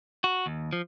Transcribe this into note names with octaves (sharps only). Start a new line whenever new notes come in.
F#4
D#2
F3